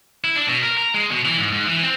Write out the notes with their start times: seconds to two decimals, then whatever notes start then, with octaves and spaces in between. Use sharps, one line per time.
0.24 E4
0.36 D4
0.48 B2
0.62 A#4
0.78 A#5
0.94 G#3
1.11 B2
1.25 E3
1.38 G#2
1.53 G#2
1.67 E3
1.83 C4